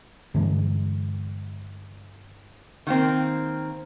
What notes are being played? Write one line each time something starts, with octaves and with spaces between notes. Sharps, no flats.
G2 D3 E3 G#3
D#3 A#3 C4